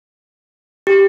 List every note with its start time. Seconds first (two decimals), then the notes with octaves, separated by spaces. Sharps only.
0.87 G4